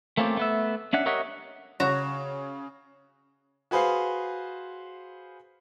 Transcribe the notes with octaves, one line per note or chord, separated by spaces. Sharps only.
A3 A#3 C4 C#4 F4 G4
A3 B3 E5
C#4 D4 E5 F#5
G4 A#4 C#5 D#5 E5 F#5
C#3 F#4 C#5 A#5 E7
F#4 G#4 B4 C5 F5